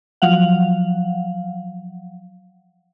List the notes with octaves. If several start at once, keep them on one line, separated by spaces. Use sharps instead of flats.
F3 F#3 F5 F#5